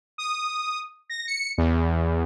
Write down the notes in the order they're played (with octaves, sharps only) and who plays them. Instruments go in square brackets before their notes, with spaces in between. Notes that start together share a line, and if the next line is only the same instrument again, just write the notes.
[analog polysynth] D#6
A#6
C#7
E2